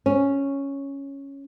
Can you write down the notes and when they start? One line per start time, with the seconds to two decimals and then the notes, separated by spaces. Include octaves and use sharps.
0.06 C#4